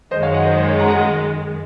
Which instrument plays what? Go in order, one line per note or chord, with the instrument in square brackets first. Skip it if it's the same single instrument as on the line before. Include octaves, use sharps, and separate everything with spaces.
[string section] F#2 D#3 G#3 [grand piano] C5 D#5
[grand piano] C#5 F5
D#5 F#5
C5
C5
C#5
F#5 A#5
D#5 F#5